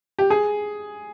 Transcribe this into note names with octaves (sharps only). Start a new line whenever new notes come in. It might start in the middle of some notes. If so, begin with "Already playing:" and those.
G4
G#4